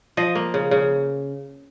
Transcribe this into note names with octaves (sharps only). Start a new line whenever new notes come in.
F3 D#5
A#3
C#3
C#3